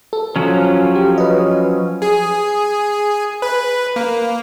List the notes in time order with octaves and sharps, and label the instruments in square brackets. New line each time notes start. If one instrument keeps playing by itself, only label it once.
[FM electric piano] A4
[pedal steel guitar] F3 F#3 C#4
[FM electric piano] G4
B4 D#5
[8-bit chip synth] G#4
B4
A#3